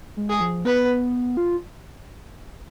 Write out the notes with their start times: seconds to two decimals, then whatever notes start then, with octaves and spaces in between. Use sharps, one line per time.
0.17 G#3
0.29 G#4
0.40 F3
0.65 B3 B4
1.37 F4